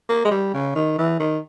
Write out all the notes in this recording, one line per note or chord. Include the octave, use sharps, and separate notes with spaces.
A#3
G#3
G3
C#3
D#3
E3
D#3